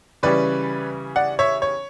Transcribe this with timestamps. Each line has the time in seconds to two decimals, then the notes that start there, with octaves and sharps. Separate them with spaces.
0.23 C#3 E3 G3 C#4 B4 D5
1.16 D5 F#5
1.39 C#5 E5
1.62 C#5